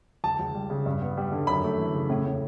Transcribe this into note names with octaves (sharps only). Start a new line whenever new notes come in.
C#2 A5
C#2
G3
C#3
G2
B3
G3
D3
F#2 B5
A3
E3
C#3
A2
A2